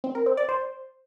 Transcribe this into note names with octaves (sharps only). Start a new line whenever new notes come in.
C4
A#4
C4
D5
C5